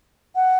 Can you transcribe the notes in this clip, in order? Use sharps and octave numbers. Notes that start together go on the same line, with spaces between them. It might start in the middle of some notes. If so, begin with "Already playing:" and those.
F#5